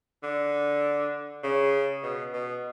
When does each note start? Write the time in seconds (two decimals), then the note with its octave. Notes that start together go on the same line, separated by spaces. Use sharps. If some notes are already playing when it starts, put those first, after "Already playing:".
0.23 D3
1.43 C#3
2.03 B2
2.33 B2